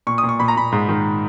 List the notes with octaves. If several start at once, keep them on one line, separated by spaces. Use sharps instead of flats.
A#2 C#6
D#6
A#2
C#6
A#2 B5
A#5
A#2 B5
G#2
D#3